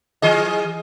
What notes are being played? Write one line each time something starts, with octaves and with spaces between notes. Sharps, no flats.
E3 G#4 D#5